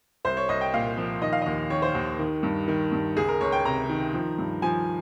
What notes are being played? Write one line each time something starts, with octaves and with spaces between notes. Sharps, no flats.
C2 C5
C#5
C2 D#5
G5
A#2 F5
F3
D#3 D#5
F5
D#2 D#5
D#3 C#5
C5
D#2
D#3
G2
D#3
G2
C#2 G#4
A#4
C#2 C#5
G5
C3 A#5
D#3
F3
G2
F3 G#5